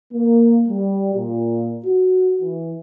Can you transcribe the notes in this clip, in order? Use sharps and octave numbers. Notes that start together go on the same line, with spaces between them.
A#3
G3
A#2
F#4
E3